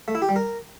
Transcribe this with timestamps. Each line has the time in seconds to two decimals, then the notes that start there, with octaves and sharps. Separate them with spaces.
0.08 A3
0.15 E4
0.22 G4
0.29 G3
0.36 A#4